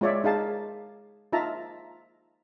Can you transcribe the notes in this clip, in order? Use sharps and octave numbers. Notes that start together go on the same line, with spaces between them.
G#3 F4 C#5 D5 E5
D#4 G#4 F5 A5
D#4 F4 E5 A5 A#5